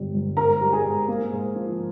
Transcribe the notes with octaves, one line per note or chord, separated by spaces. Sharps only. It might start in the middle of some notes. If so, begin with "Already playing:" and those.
Already playing: G1 G3
G1
G#2 A#4 A#5
G3
G#4 G#5
G#2
A#3
G#2
F3